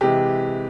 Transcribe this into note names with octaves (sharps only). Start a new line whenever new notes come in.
C3 E3 G#3 G4